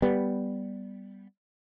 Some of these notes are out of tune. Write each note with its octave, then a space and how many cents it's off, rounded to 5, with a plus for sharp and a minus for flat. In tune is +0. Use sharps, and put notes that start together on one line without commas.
G3 +0 B3 +0